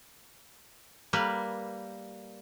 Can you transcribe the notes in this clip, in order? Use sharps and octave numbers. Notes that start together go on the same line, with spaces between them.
G3 A#3 B4